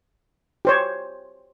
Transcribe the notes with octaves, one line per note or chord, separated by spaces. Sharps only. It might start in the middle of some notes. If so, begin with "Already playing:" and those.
G4 C5 C#5